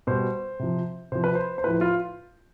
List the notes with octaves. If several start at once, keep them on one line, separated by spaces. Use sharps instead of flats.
B2 G3 C5
C3 F3
C3 F3 C5
B4
C5
C5
A2 F3 B4
F4